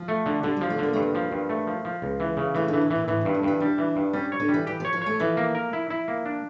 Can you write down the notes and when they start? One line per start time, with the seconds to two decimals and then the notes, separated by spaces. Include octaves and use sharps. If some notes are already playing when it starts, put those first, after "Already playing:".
Already playing: F3
0.08 A3
0.26 D3
0.43 D3 G3
0.56 G3
0.61 F3 A#3
0.70 A3
0.79 D3 A#3
0.93 G2 A3
1.02 A#3
1.15 F3
1.32 G2
1.49 A3
1.67 F3
1.85 F3
2.02 C#2
2.20 E3
2.37 C#3
2.55 E3 A3
2.68 D3 E3
2.81 C#3
2.90 E3
2.95 A#2
3.08 A2 E3
3.21 G2 C#3
3.34 D3
3.43 G2 E3
3.60 G3 D4
3.78 E3
3.96 G2
4.13 G3 C#4
4.32 C#5
4.40 D3
4.49 G3
4.54 E3
4.67 E3 G4
4.80 F3
4.85 C#5
4.93 F3
5.02 A3 C#5
5.19 E3 F3
5.37 A#3
5.55 A#4
5.73 E4
5.90 E4
6.08 A#3
6.26 D4